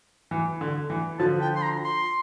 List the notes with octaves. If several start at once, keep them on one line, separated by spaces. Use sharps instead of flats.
E3
D3
E3
D3 F3 A5
G5
C6
A#5
C6